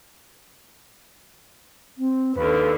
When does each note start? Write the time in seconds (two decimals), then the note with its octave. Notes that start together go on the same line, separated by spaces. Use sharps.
1.98 C4
2.35 D#2 D3 B4